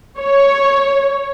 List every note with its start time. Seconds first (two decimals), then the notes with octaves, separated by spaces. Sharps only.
0.19 C#5